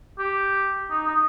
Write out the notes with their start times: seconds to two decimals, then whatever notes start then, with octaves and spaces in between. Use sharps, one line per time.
0.19 G4
0.91 D#4
1.07 D#4